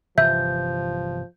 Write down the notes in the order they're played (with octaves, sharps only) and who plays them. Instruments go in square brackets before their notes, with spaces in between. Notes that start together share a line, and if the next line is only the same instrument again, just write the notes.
[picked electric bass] G1 C3 E3 [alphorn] F3 [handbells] E5 [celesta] G6